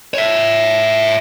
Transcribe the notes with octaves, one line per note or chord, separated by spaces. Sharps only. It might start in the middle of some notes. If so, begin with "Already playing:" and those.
C#5 E5